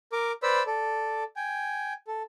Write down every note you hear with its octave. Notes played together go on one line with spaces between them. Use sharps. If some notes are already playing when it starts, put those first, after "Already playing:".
A#4 D6
B4 C5 D5 B5 E6
A4 D5
G5 G#5
A4